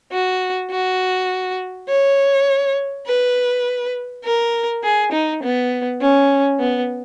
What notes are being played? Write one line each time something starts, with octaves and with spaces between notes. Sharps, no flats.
F#4
F#4
C#5
B4
A#4
G#4
D#4
B3
C#4
B3